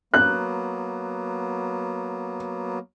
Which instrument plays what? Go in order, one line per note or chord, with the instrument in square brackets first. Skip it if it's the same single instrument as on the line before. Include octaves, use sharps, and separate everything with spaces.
[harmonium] F#3 A#3 B3 [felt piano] F#6